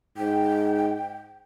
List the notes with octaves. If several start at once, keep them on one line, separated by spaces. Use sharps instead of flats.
G#2 G5